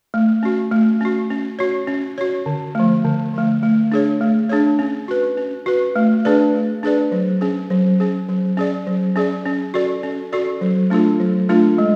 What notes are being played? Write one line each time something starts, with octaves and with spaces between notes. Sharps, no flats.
A3
C#4 F#4
A3
C#4 F#4
C#4
F#4 C#5
C#4
F#4 C#5
D3
F3 A3
D3
F3 A3
A3
D4 G#4 C#5
A3
D4 G#4 C#5
C#4
F#4 B4
C#4
F#4 B4
A3
D4 G#4 B4 D5
A3
D4 G#4 B4 D5
F#3
C#4 G#4
F#3
C#4 G#4
F#3
C#4 G#4 D5
F#3
C#4 G#4 D5
C#4
F#4 A4 D5
C#4
F#4 A4 D5
F#3
A3 D4 F4 A4
F#3
A3 D4 F4 A4
G#3